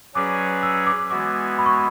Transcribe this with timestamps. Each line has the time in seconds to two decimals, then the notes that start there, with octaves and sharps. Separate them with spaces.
0.15 F#3 C#4 G#4 B4 D5 D6
0.63 E6
0.87 D6
1.10 E3 G#3 B3 F#4 D6
1.59 B5
1.66 C#6
1.73 B5